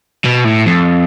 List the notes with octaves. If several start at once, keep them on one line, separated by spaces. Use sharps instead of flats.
B2
A2
F2